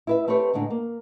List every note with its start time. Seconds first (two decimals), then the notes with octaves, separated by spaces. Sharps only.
0.07 E4 B4 E5
0.28 A3 C4 G4 B4 C#5
0.53 A2 D3 G#3 D4 D#4
0.70 A#3